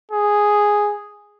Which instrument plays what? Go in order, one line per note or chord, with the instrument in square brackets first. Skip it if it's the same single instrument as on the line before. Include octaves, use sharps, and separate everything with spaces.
[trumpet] G#4